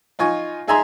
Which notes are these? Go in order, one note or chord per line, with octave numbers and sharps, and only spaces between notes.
D#4 F4 G#5 C#6
D#4 G#4 E5 G#5 A#5 C6